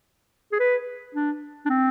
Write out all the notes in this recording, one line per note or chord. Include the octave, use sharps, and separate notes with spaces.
G#4
B4
D4
D4
C4